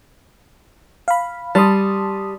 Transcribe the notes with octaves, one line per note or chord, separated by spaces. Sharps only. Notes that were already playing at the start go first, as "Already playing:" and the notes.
F5 B5
G3 A5 C6 D#6